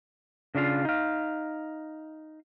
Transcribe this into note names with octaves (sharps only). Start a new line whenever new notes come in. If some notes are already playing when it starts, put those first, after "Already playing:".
C#3 D4 F4 F5
D#4 F5